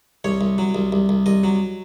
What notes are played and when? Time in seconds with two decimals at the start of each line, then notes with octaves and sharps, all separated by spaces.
0.24 C2 C#5
0.41 C2
0.58 F#3
0.75 C2
0.92 C2
1.09 C2
1.26 C2 D#5
1.44 F#3